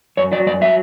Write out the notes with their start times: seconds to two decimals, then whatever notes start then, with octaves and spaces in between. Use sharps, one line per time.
0.17 F#2 C#5
0.32 F#3 D5
0.47 F#2 D5
0.61 F#3 E5